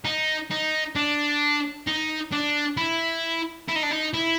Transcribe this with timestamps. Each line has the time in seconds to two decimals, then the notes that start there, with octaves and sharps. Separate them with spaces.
0.05 D#4
0.51 D#4
0.96 D4
1.87 D#4
2.32 D4
2.77 E4
3.68 E4
3.75 D#4
3.83 D4
3.91 D#4
4.14 E4